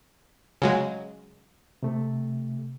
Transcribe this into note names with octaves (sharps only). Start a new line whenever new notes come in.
C#3 F#3 G#3
C3 A3